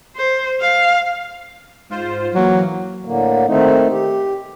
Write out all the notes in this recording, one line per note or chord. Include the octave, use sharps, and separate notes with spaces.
C5
F5
G#2 F4 C5
E3 F#3 A#3
A2 D3 A#3
D#3 A3 C4 D#4
G4